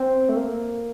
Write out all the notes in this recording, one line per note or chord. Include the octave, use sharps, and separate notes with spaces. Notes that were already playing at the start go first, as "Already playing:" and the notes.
Already playing: C4
A3
A#3